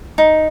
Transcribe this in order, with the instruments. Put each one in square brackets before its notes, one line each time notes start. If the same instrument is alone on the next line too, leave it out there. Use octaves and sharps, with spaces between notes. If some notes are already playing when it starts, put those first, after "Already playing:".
[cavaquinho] D#4